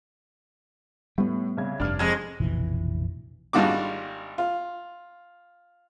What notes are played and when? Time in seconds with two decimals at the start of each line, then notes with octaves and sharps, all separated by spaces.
1.18 A2 G3 B3
1.57 C2 C#3 G#6
1.80 F1 G2 D4 F6
1.99 F2 G#3 G#6
2.40 F1 A#1 B2 E3
3.53 G#1 G3 D4 F4 F#4 D6
4.38 F4